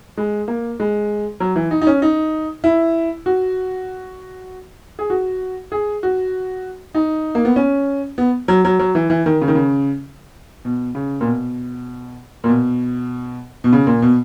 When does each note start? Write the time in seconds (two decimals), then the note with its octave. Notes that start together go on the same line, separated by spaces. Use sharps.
0.18 G#3
0.48 A#3
0.80 G#3
1.40 F#3
1.56 E3
1.71 D#4
1.81 D#4
1.87 C#4
2.02 D#4
2.64 E4
3.26 F#4
4.99 G#4
5.10 F#4
5.72 G#4
6.03 F#4
6.95 D#4
7.35 A#3
7.45 B3
7.56 C#4
8.18 B3
8.48 F#3
8.65 F#3
8.79 F#3
8.95 E3
9.10 E3
9.26 D#3
9.41 C#3
9.48 D#3
9.55 C#3
10.65 B2
10.95 C#3
11.21 A#2
11.25 B2
12.44 A#2
12.49 B2
13.64 B2
13.73 C#3
13.87 A#2
14.02 B2